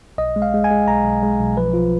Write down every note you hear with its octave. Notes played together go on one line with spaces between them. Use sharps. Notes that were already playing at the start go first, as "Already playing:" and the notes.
B1 D#5
G#3
F5
G#3
G#5
G#3
B1 A#5
B1
G#3
B1
F3 B4
F3 F4